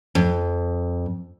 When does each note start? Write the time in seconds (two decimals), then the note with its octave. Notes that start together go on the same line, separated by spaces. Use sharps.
0.15 F2